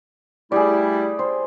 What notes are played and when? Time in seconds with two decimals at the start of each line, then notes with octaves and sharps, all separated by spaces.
0.52 G3 A3 E4 G#4 D5
1.19 C5